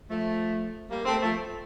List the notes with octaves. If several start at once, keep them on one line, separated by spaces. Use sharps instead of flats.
F3 A3
G3 A#3
A3 C4
F3 A3